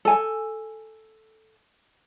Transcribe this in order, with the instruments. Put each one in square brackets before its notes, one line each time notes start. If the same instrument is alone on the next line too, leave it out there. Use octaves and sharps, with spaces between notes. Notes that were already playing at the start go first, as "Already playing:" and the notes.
[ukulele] A4 G#5